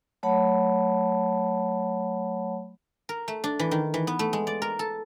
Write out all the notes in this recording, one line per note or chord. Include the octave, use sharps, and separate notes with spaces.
F#3 A3 C#5 F#5 A5 B5
A#4
A3
D4
E3
D#3
E3
B3
A3
G#3
D5
A#4
A4